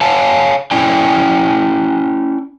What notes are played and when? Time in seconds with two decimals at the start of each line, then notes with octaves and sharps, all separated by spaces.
0.01 C#5 F5 G#5 A5
0.71 C#4 E4 D5 G5 G#5